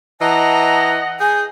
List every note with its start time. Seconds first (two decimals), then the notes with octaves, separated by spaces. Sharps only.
0.21 E3 D#5 F#5 A5 A#5
1.20 G#4 G#5 G6